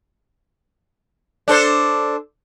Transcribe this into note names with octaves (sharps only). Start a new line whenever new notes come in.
D4 A4 C5